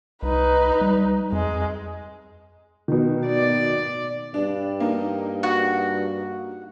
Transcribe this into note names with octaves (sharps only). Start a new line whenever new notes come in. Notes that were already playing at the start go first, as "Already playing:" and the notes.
C2 D#4 B4
G3
F2 G#3
B2 D#3
D5
G2 D4
A#3 D#4
F#4